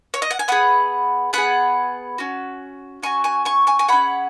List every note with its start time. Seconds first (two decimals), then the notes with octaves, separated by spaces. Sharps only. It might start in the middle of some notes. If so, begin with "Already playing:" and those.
0.14 C#5
0.22 D#5
0.31 F#5
0.39 G#5
0.48 B3 G#4 F#5 B5
1.33 B3 G#4 F#5 B5
2.18 C#4 F#4
3.03 C#4 F#4 G#5 C#6
3.24 G#5 C#6
3.45 G#5 C#6
3.67 G#5 C#6
3.79 G#5
3.88 C#4 G#4 F#5 B5